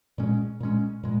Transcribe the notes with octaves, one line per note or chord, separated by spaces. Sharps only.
A#2 G#3 C#4
A#2 G#3 C#4
A#2 G#3